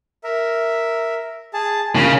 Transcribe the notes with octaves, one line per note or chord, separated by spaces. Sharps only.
A#4 E5
G#4 A5
C#3 F4 A#4 F6